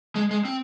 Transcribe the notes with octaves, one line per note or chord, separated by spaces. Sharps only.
G#3
G#3
C4